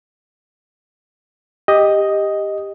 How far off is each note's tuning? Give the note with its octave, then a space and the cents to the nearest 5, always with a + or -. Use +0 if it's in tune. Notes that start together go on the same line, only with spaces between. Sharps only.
G4 +15 D#5 +0